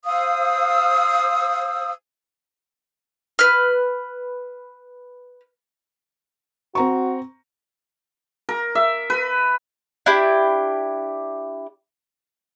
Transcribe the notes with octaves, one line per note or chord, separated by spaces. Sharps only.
C5 F5 D#6 E6
B4 F6
C4 F#4 A#5 C#6
A#4
E5
B4
D4 E4 G4